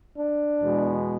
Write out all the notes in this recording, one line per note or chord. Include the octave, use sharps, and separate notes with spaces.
D4
E2 B2 G#3